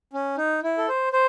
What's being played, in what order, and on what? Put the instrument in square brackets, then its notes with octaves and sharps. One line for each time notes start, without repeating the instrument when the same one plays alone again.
[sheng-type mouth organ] C#4
D#4
E4
A4
C5
C5